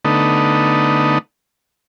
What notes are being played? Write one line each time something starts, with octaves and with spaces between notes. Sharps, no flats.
D3 A3 B3 D#4